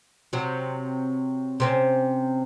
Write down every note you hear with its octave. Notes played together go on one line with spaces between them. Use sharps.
C3 F#3
C3 C4 C#4